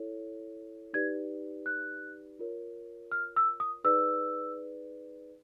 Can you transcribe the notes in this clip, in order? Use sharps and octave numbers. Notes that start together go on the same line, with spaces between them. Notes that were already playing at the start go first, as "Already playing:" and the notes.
Already playing: E4 A4 C#5
D#4 G4 B4 D5 G#6
F#6
F4 A#4 C#5
F6
E6
D#6
D#4 G#4 B4 D5 E6